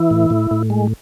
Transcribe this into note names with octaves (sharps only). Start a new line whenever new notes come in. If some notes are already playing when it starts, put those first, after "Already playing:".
Already playing: E3 E4
A2
A2
A2
G#3